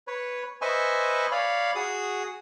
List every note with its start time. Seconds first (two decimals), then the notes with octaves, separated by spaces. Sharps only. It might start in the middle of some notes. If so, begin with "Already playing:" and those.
0.07 B4 C#5
0.62 B4 C5 D#5 E5 G#5 C#6
1.32 C#5 D5 F5 B5
1.75 F#4 G#4 D#6